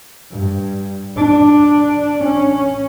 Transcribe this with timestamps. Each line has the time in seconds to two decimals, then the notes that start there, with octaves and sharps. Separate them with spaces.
0.32 G2
1.17 D4
2.24 C#4